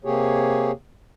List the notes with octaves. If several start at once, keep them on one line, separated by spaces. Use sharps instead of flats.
C3 A#3 G4 G#4 C#5